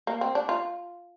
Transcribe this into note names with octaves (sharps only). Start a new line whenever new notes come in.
A#3
C4
D4
F4